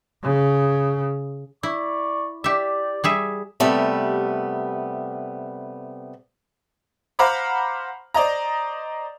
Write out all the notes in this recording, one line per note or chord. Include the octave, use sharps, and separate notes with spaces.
C#3
E4 D5 C#6
G4 D5 E5
G3 G#4 E5
C3 G3 A3 B3
C5 F5 F#5 A#5 B5 D6
C5 D5 D#5 A#5